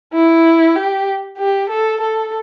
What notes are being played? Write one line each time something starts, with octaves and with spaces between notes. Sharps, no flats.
E4
G4
G4
A4
A4